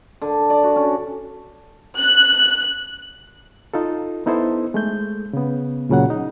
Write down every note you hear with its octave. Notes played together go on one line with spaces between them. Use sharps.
D3
D5
F#4
C#4
F#6
D#4 F4 A4
B3 D#4 E4 A4 C5
G#3 A3 G6
C#3 B3
C#2 A#2 C#3 F#3 F#5
D#4